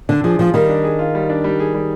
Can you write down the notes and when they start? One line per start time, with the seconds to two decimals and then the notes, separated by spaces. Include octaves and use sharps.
0.09 D3 D4
0.24 F3 G#4
0.38 F3 F4
0.54 D#3 G3
0.69 D4
0.84 G#4
0.99 F4
1.15 G3
1.30 D4
1.44 G3
1.60 G#4
1.74 G3